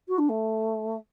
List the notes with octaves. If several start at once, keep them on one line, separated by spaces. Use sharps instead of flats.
F#4
D4
A3